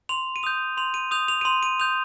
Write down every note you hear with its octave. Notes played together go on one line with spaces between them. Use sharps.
C6 F7
D#7
D#6 G6 F7
C6 F7
D#7
D#6 G6 F7
F7
D#7
C6 F7
D#7
D#6 G6 F7